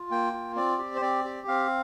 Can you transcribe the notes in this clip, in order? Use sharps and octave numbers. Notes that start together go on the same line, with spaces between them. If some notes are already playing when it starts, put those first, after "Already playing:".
Already playing: F4
A#3 G5
F4
C4 D5
G4
C5
C4 D5
G4
C4 F5